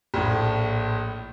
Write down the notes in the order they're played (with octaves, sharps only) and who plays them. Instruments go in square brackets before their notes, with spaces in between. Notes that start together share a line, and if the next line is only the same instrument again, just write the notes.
[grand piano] A#1 A2